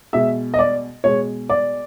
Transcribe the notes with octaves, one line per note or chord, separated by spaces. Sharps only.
B2 G#3 E5
D#5
D5
B2 G#3 C#5
D5